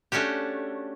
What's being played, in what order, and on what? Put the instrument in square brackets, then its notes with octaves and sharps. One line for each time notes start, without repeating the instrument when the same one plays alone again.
[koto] A3 C#4 D4 F#4 G4